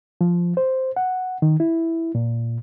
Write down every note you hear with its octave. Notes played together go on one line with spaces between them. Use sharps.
F3
C5
F#5
D#3
E4
A#2